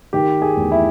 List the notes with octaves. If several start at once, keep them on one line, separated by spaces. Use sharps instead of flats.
D#3 G4
G#4
E2
E4